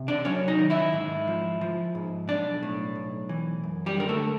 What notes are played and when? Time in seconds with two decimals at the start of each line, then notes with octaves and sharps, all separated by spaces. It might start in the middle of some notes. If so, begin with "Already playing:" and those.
Already playing: C3
0.08 D4 D5
0.25 F#3 C#4 C#5
0.48 D#4 D#5
0.59 D#3
0.70 E4 E5
0.93 G#2
1.27 F3
1.61 F3
1.95 G#2
2.28 B1 D4 D5
2.63 A2
2.96 B1
3.29 E3
3.64 F#2
3.86 G3 G4
3.98 D3 A#4
4.09 A3 A4